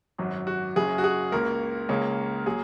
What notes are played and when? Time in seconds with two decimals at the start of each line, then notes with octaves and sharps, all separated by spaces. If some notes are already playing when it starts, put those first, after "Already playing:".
0.18 G#1 F#2 F#3
0.47 F#4
0.76 F#1 F#2 C#3 G#4
0.98 F#4
1.04 G#4
1.32 C#2 C#3 A#3 A#4
1.89 C#2 C#3 A#3 C#4
2.46 F#3 A#3 G#4